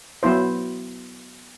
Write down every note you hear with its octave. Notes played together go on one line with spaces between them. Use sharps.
F#3 B3 E4 C5